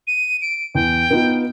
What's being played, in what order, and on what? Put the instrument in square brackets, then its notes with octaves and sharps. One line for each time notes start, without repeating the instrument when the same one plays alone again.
[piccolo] D#7
D7
[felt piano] E2 [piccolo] G5
[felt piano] B3 D#4 F4